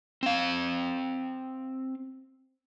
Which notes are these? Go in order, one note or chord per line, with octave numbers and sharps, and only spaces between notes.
C4 F5